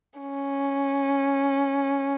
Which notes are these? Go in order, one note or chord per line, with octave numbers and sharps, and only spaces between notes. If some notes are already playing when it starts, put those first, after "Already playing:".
C#4